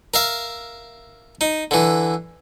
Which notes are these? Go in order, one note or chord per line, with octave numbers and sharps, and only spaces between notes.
A#4 E5 F5
D#4
D3 E3